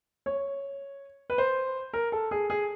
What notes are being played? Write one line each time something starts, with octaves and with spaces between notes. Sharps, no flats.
C#5
B4
C5
A#4
A4
G#4
G#4